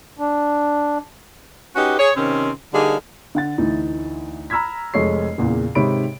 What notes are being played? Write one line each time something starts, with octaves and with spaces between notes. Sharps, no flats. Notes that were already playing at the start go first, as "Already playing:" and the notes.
D4
C#4 D#4 F#4 G4 B4
G#4 C#5
C3 D#3 C4 C#4
D3 G3 A#3 D#4 G#4
D3 F#5 A6
D2 E3 D#4
A#5 B5 E6 F6 G#6 B6
F1 G#3 A4 C#5 C7
E2 A#2 C#3
G#2 C3 D#3 C#5 B5 D7